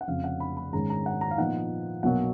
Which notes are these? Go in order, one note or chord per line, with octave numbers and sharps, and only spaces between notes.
F#5
F1 F2 C#3 F5
F#5
B5
B5
G#2 D#3 G#3 C#4 A#5
A#5
F#5
A#5
F5
A#2 F3 B3 D#4 F#5
B1 B2 F#3 A#3 F#5